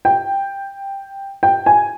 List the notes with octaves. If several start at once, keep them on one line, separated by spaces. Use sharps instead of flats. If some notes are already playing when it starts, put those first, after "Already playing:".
G5
G5
G#5